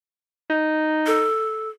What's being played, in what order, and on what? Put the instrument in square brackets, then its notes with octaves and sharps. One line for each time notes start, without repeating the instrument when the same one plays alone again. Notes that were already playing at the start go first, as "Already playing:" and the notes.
[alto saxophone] D#4
[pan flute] A4